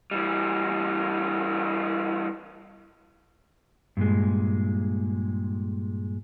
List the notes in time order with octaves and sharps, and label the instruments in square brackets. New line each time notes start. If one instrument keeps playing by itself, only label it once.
[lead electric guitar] E3 G3
[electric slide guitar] G2 A#2 G#3